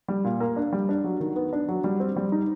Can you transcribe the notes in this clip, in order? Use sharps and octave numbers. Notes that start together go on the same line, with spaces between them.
G3
A#2
A#3
D4
G3
D4
F#3
D#3
B3
D4
F#3
G3
C4
G3
D#4